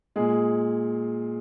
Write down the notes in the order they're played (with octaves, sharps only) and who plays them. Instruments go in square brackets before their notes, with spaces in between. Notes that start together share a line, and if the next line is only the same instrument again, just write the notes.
[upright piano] A#2 G#3 G#4